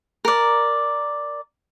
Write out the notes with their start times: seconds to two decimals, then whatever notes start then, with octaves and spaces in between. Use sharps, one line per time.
0.25 A#4 D5